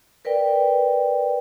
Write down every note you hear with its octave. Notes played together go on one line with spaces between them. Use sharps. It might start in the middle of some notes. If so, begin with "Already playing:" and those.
A#4 B4 D5 G5